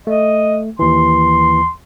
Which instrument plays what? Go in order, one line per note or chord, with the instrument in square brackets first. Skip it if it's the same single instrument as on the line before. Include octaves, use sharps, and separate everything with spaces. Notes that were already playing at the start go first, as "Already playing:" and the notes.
[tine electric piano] A3 [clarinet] D#5
[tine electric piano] D#2 E3 [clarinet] C6